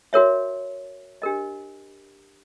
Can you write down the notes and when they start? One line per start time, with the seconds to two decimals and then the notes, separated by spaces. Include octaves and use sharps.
0.13 F#4 A#4 C#5 E5
1.22 D4 G4 A#4 D#5